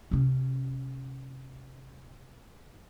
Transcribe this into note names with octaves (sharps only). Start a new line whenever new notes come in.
C3 C#4